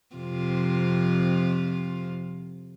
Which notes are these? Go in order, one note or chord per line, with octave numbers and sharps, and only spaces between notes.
F2 C3 F4